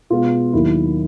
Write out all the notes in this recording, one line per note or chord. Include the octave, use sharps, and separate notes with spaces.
B2 G#3 B3 F4
D#2 D#3 F#3 A#3 E4